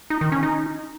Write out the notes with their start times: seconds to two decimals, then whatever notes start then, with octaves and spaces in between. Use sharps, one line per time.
0.10 D#4
0.21 D#3
0.32 C#4
0.43 D#4